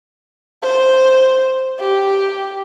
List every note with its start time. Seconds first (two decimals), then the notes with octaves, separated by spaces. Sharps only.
0.62 C5
1.79 G4